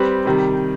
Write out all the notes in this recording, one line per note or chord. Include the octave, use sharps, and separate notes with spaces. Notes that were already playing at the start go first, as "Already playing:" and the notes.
Already playing: G3 C4 G4 B4
C3 D#3 G3